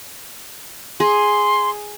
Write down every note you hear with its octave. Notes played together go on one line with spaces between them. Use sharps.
G#4 C6